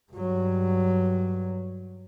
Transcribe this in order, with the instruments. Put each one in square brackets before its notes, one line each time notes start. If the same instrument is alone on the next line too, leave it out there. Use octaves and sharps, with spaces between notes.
[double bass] G2 F#3